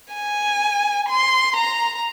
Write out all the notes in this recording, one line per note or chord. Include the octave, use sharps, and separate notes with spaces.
G#5
C6
A#5